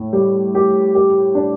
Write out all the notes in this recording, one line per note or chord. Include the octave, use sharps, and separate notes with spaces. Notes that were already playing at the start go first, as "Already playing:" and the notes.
Already playing: A2
G3
G4
G4
D4